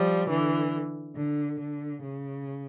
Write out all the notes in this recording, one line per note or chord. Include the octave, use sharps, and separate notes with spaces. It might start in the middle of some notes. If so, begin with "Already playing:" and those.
Already playing: F3 G3
D3 E3
D3
D3
C#3